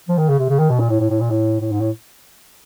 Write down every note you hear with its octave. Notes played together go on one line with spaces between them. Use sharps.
F3
D#3
C#3
C3
C#3
D#3
B2
A#2
A2
A2
A2
A#2
A2
A2
G#2
A2